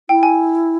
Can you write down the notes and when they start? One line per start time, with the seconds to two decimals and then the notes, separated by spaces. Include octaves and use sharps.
0.09 E4 G5
0.23 G#5